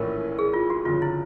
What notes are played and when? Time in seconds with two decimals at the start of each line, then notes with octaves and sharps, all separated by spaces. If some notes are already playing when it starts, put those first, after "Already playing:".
Already playing: A#1 A2 E3 A3 C#4 A#4
0.38 G#4
0.53 F4
0.70 F#4
0.85 G1 F2 C#3 F#3 F4
1.02 E4